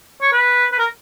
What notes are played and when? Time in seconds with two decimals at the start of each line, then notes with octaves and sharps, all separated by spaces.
0.21 C#5
0.32 B4
0.72 B4
0.79 A#4